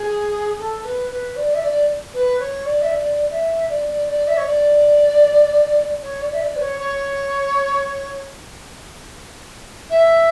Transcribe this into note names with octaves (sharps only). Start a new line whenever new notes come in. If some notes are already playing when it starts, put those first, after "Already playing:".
Already playing: G#4
A4
A4
B4
B4
D5
E5
D5
B4
C#5
D5
E5
D5
E5
D5
D5
D5
E5
C#5
D5
C#5
D5
E5
D5
B4
C#5
C#5
E5